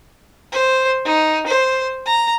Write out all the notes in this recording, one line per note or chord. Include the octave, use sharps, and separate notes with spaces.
C5
D#4
C5
A#5